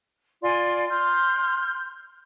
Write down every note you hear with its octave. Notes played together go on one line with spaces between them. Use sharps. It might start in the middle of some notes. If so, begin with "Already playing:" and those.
F4 D5 G#5 C6
C6 F6 G6